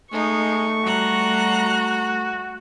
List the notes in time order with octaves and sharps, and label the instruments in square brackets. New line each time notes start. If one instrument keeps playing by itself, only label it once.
[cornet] G#3 [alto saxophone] A3 [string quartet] D#4 [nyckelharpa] C#6
[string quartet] G3 A#5 F#6 [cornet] F#4